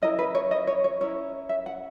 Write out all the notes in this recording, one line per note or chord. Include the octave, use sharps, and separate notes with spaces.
C#4 E4 A#4 D#5
B4
C#5
D#5
C#5
C#5
C#4 E4 A#4 C#5
E5
F#5